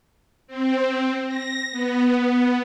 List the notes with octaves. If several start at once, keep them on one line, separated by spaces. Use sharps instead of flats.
C4
A#6
B3